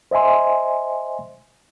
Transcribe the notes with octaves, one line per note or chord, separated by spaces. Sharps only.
C5 D#5 E5 G#5 C6